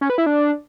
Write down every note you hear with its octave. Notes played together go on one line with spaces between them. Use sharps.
C#4
B4
E4
D4